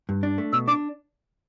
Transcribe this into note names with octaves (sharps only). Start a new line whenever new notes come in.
G2
D4
A3
B2 E6
D4 D6